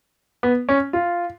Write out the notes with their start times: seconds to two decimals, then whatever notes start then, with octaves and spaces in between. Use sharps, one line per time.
0.43 B3
0.69 C#4
0.93 F4